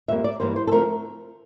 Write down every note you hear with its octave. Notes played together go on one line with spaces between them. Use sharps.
F2 D3 G3 A#3 E5
D5
G2 E3 G3 A#3 C5
C5
A4
D3 F3 A3 C4 A#4